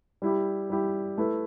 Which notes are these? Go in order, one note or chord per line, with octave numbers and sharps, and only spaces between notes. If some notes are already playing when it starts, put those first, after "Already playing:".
G3 E4 G4
G3 E4 G4
A3 E4 B4